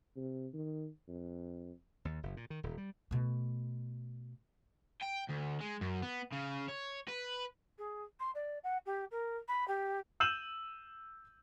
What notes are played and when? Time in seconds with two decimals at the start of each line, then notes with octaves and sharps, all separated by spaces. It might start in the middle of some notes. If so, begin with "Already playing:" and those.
0.16 C3
0.53 D#3
1.08 F2
2.05 D#2
2.23 F#1
2.37 A#2
2.50 D#3
2.63 D#1
2.78 G3
3.11 B2 A3
5.02 G5
5.29 D2
5.61 G#3
5.81 F#2
6.02 B3
6.32 C#3
6.68 C#5
7.08 B4
7.78 G#4
8.19 C6
8.34 D5
8.63 F#5
8.85 G4
9.11 A#4
9.48 B5
9.68 G4
10.20 E6 G6 D#7 E7 F#7